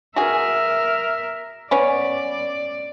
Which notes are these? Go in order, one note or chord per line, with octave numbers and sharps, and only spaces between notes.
F#4 G#4 A#4 E5
B3 C#4 D5